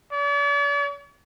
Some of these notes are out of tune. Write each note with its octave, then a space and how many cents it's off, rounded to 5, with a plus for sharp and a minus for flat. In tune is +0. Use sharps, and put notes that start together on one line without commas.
D5 -45